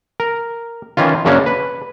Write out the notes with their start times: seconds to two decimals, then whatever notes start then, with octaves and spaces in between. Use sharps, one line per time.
0.20 A#4
0.97 D#3 E3 C#4 F4
1.25 F#2 C#3 A#3 C#4 D4
1.46 B4